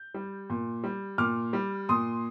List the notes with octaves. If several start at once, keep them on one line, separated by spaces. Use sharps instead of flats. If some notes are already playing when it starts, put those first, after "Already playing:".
Already playing: G6
G3
A#2
G3
A#2 D6 F6
G3
A#2 C6 D#6